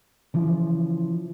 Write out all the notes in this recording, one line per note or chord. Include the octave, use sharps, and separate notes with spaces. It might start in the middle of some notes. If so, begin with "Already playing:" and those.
C#3 E3 F3